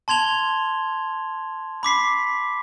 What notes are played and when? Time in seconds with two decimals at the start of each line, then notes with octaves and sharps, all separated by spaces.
0.08 A5 C6 G#6 F7 G7
1.83 B5 D6 B6 C7